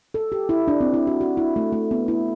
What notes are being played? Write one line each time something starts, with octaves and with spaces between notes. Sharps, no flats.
A4
G4
E4
D4
C4
E4
F#4
F#4
E4
A3
A3
B3
E4